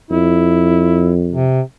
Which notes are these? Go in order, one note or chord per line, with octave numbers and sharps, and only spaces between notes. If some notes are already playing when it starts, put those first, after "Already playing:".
F2 E4
C3